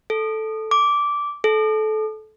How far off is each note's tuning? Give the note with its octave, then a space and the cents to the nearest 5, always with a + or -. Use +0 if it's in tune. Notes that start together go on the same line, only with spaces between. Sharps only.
A4 -5
D6 -10
A4 -25